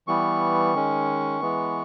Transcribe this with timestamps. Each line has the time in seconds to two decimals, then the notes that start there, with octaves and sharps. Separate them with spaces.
0.07 E3 G3 B3 C#6
0.74 D#3 G#3 C#4
1.41 E3 G#3 B3